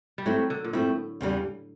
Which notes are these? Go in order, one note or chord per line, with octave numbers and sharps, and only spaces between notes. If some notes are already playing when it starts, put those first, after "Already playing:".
G3
F#3 A3 C4 E4
D3
A#2
A2 A3 C4 E4
E2 C#3 E3 G3